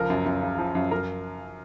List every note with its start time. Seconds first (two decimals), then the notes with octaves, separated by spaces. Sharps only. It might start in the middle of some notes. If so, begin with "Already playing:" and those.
Already playing: C#2 F3 A#4
0.10 F#2
0.26 F#2
0.42 C#3
0.58 F3
0.75 F#2
0.91 F#2 A#4